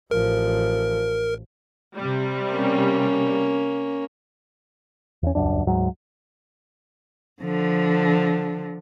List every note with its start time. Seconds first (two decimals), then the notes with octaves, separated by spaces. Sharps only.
0.11 A1 F3 A#4
1.97 C3 G3
2.52 A#3 C#4
5.23 E2 C#4
5.35 D#1 C#2 F#2 D4
5.67 D2 G#2 F#3 G#3
7.42 D3 F3